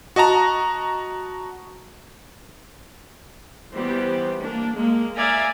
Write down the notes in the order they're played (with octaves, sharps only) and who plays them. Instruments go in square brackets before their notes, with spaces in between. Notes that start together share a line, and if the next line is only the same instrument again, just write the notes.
[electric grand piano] F#4 D#5 A5 A#5
[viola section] E3 G3 B3 G4 C5
A#3 D4
G#3 A#3
D5 E5 F5 G#5 A#5